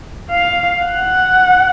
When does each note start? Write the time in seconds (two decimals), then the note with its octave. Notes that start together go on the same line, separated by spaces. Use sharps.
0.31 F5
0.85 F#5